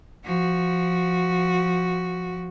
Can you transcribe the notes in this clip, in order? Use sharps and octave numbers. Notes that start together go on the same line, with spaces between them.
F3 F#4